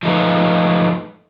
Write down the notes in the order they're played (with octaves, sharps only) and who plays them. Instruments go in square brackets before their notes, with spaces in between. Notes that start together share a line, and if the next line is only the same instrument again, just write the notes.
[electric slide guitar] F3 G#3 A3 D#4 F4 B4